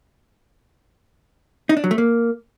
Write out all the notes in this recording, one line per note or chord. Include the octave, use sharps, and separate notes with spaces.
D#4
D4
F#3
A3
A#3